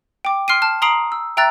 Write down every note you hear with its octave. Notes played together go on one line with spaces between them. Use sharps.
G5 D6
C6 F6 C7 D7 D#7
A5 F6
A#5 C6 D#6 C7 D7 F#7
E6
E5 G5 A#5 E6 F#6 A6